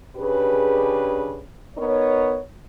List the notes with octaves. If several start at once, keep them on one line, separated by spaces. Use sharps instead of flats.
C#3 D4 G4 G#4 B4
B3 D#4 A#4 C#5